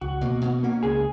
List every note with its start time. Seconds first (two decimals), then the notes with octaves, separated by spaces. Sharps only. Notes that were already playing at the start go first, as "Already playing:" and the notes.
0.01 C#2 F#4
0.21 B2 A#3
0.41 B2
0.63 A#3 C#4
0.82 C#2 G#4